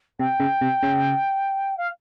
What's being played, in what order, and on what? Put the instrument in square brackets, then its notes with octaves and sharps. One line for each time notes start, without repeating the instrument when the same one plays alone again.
[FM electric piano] C3 [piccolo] G5
[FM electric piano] C#3
C3
C#3
[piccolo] F5